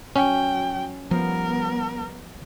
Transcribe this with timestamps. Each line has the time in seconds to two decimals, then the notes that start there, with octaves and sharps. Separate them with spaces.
0.16 F#3 C#4 G5
1.11 F3 G3 B3 A#4